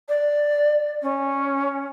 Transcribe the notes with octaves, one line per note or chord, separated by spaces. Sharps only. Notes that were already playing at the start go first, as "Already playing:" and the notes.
D5
C#4